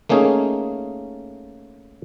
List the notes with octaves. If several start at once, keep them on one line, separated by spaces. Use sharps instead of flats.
A3 A#3 C#4 D#4 G#4